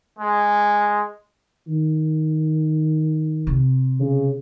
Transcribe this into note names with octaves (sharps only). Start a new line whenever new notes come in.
G#3
D#3
C3
C#3